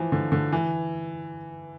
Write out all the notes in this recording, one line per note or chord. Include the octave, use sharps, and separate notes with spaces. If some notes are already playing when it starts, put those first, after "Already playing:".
Already playing: E3 F3
D3
D3
E3